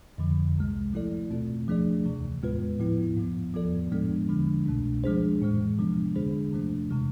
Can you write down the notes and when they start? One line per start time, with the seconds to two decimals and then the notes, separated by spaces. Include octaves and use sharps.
0.18 F2 D3 F3
0.56 C2 C3 G#3
0.93 F3 A3 E4 A4 D5
1.30 B2 A3 C4 F4
1.68 F3 A3 D4 G#4 D5
2.05 D2 C3 E3
2.42 A2 G#3 B3 F4 B4
2.80 A2 F3 B3 E4
3.17 G#2 F3 B3
3.54 F3 B3 F4 A4 D5
3.92 A2 F3 G#3 B3 D4
4.29 D3 F3 G#3 D4
4.66 C2 B2 A3 D4
5.04 F3 G#3 D4 G#4 C5
5.41 A2 E3 G#3
5.78 C3 F3 G#3 B3 D4
6.15 D3 G#3 D4 G#4 C5
6.53 C3 F3 A3 D4
6.90 C3 E3 G#3